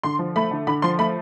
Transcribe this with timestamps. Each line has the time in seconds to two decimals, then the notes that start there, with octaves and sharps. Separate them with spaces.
0.03 D3 C6
0.19 F3
0.36 A3 B5
0.51 D3
0.67 D3 B5
0.82 F3 C6
0.99 A3 B5